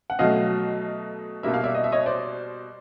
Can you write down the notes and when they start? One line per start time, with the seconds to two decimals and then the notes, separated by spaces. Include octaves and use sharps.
0.10 F#5
0.19 B2 F#3 A3 D#5 F5
1.43 B2 G3 A#3 E5
1.54 F5
1.64 D5 E5
1.74 D#5
1.84 E5
1.92 C#5 D#5
2.06 C5 D5